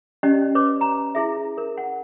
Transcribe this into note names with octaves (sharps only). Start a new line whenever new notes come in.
C#4 G4 D5 D#5
B4 C#5 D6
A#5
E4 G#4 E5
A#4
F#5